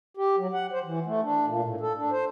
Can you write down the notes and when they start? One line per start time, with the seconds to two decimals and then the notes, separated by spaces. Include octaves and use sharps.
0.17 G4
0.38 F#3
0.53 F#5
0.72 C5
0.84 E3
1.06 A3
1.23 D4
1.46 A#2
1.64 A2
1.81 A4
1.98 D4
2.11 C5